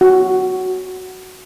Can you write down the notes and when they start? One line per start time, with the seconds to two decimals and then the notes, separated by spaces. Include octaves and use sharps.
0.01 F#4